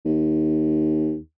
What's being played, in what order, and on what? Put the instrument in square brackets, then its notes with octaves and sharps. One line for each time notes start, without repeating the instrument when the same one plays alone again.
[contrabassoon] D#2